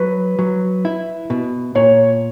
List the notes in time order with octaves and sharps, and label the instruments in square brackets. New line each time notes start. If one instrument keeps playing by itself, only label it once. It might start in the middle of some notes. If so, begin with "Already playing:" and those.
Already playing: [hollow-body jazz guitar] F#3 [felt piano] B4
[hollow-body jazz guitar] F#3
E4
B2
[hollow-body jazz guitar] A#2 [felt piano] C#5